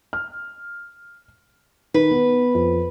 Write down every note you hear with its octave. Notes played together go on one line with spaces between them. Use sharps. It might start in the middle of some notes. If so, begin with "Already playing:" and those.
F6
D#3 B4
B3
F2